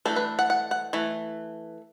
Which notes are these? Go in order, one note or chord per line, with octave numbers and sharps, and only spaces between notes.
E3 A3 D4 A4
B4
F#5
F#5
F#5
E3 A3